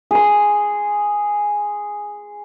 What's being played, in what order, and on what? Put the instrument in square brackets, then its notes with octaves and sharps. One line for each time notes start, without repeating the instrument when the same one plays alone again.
[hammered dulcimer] G#4 C6